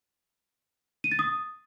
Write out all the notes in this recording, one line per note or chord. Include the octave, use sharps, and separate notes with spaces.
D#7
A6
D#6